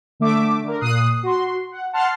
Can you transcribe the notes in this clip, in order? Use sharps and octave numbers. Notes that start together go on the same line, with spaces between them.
D3 A3 E5 D6
D3 A#4
A#2 D#6 F#6 C7
F#4 C6
F#5
F#5 A5 C6 F6 C7